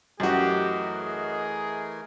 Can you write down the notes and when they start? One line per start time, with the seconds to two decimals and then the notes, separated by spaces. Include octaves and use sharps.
0.20 F#2 E3 A3 F#4 G4 A#4 D#5
0.98 G#4